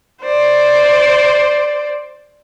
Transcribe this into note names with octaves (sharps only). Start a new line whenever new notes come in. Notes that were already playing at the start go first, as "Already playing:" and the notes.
C5 D5